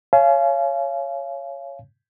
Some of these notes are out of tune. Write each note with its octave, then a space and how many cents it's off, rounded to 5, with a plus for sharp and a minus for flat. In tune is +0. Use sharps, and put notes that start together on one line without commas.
C#5 +0 F5 -25 G#5 +30